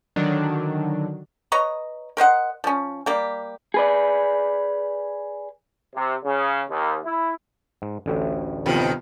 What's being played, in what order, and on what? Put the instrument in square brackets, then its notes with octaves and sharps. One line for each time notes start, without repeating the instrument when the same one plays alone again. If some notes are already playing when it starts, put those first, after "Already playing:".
[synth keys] D3 D#3 F#3 D4
[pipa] B4 C#5 D#5 A#5
A#4 C5 D#5 F#5
F3 C#4
G3 A#3 G4
[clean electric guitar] G#4 B4 D5
[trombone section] C3
C#3
D#2
E4
[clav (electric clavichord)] G#2
A1 D2 A2
[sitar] F2 D#3 [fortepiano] C3 F3 B3